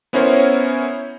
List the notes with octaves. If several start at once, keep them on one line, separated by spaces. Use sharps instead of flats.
B3 C#4 E4 A#4 C5 C#5